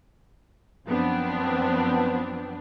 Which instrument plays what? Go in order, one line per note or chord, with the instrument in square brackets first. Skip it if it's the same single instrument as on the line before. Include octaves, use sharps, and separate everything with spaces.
[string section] F#2 F3 B3 C4 D4